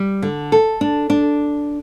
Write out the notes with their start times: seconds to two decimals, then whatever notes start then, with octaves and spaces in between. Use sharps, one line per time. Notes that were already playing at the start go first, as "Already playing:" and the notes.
Already playing: G3
0.22 D3
0.52 A4
0.81 D4
1.10 D4